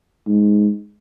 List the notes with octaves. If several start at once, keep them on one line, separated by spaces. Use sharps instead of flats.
G#2